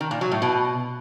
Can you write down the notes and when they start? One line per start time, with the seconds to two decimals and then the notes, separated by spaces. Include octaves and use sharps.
0.01 D#3
0.11 A#2
0.21 F#3
0.31 A2
0.42 B2